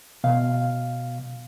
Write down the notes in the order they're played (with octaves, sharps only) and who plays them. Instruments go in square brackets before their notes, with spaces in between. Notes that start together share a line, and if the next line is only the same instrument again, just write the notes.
[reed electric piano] B2 F5